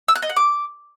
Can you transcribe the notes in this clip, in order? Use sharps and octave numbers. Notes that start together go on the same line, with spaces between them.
E6
F#6
D#5
F#5
D6